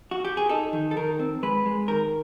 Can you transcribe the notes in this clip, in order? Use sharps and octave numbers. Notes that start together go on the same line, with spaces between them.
F#4
G4
G#4
D#4 A4
D#3
A4
D#3 A#4
C4
G#3 B4
G#3
D#3 A#4